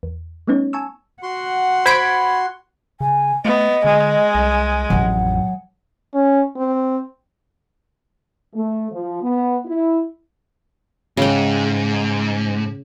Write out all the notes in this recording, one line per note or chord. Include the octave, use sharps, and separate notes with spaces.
E2
G3 A3 B3 C#4 D#4 C#5
G#5 A5 C#6 E6
F#4 F#5 C6
C5 B5 G#6 B6 D7
C#3 G#5
A3 B3 D#5
D3 G#3
C2
A1 F2 F#3 F#5
C#4
C4
A3
F3
B3
E4
G#2 C#3 G5